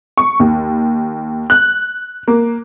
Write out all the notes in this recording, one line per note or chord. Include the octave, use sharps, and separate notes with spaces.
C#6
D#2
F#6
A#3